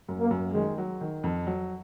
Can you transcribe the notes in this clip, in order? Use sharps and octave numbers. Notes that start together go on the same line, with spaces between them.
F#2
A#3
F#2
D#3 G#3
F#3
D#3
F2
F#3